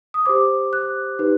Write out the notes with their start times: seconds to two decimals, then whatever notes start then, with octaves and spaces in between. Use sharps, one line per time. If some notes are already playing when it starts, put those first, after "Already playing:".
0.14 D#6
0.25 G4 C5 D6
0.73 F#6
1.19 D#4 G4 B4